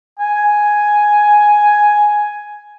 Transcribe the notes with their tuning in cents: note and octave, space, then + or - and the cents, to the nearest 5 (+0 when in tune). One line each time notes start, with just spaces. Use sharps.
G#5 +5